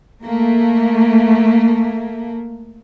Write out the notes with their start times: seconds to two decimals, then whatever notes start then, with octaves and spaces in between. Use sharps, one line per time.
0.24 A3 A#3